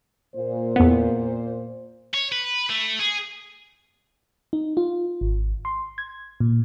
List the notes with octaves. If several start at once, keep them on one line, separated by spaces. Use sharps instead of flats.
A#2 C5
E2 B3
C#5
B4
A3
G#4
D#4
F4
G#1
C6
G#6
A#2